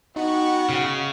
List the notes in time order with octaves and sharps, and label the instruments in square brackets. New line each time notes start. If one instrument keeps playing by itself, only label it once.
[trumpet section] B3 C#6 [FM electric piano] D#4 [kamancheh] F#4 G5
[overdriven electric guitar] C#3